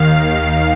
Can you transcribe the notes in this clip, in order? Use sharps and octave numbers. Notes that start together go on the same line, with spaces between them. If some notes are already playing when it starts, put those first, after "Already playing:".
Already playing: D#2 D#3 F5
F5